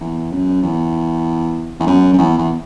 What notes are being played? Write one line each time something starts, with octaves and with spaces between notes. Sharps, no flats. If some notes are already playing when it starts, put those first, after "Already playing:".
E2
F#2
E2
E2
F#2
F#2
E2
E2